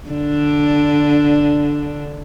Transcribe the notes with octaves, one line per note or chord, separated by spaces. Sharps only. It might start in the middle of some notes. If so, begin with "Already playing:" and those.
D3 D4